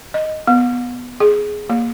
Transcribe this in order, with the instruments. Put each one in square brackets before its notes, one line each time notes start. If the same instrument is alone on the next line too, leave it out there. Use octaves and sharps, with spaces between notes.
[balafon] D#5
B3
G#4
A#3